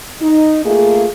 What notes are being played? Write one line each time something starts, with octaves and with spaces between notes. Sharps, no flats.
D#4
A3 A#3 F4 G#4